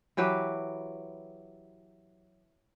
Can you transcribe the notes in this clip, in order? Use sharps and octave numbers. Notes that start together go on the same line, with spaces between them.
E3 F#3 G4 B4